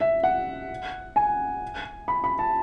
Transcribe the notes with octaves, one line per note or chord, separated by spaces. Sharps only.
E5
F#5
G#5
B5
B5
A5